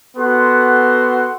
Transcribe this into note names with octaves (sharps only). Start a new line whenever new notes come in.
B3 F#4 A4 F#5 C6